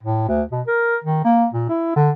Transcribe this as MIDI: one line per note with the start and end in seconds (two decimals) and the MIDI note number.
0.03 0.27 45
0.28 0.43 38
0.52 0.62 47
0.68 0.97 70
1.04 1.22 51
1.24 1.46 58
1.53 1.66 46
1.69 1.92 64
1.96 2.11 50